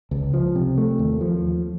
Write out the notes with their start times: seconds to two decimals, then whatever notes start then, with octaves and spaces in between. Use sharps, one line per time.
0.11 C#2
0.34 F3
0.55 C3
0.78 A3
0.99 D#2
1.21 F3